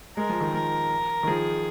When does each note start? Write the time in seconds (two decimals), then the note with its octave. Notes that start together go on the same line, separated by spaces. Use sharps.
0.16 G#3 A#4
0.29 F3
0.41 D#3
0.54 F3 A#4
1.23 D#3
1.28 F3 G#4